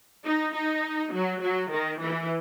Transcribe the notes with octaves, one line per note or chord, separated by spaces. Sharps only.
D#4
D#4
F#3
F#3
D#3
E3